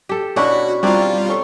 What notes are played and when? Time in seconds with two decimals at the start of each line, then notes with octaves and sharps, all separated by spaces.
0.09 G4 A4
0.36 B2 C#4 D4 E4 F#4 F#5 B5
0.83 G3 C4 D4 E4 F4 D5 A#5
1.28 A4 C#5 A5